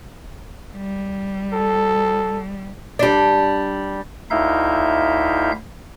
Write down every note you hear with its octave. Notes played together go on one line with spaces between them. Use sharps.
G3
A4
G3 D4
D2 D#4 E4 E5 F5 G6